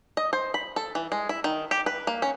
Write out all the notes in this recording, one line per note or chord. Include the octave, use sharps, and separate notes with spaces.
D#5
C5
B5
A4
E3
G#3
E4
D#3
G4
B4
A#3
C#4